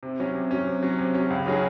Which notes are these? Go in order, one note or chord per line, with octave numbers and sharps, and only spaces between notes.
C3
F#3 C#4
C3
F#3 C#4
C3
F#3 C#4
C3
F#3 C#4
C#2
C#3 F#3 C#4 G#4